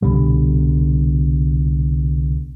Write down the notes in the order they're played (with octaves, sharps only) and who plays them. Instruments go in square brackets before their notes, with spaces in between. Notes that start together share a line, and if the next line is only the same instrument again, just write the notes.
[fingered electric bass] C2 B2 D3 G3